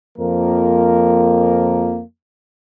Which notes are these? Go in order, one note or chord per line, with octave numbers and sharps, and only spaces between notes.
F2 F3 A#3 A#4